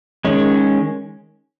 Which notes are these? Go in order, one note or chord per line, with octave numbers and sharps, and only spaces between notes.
D#3 G#3 C#4